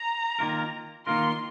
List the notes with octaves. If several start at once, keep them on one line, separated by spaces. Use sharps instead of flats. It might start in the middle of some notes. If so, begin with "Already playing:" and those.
Already playing: A#5
D#3 A#3 F4 A#4
D#3 A#3 F4 A#4 C6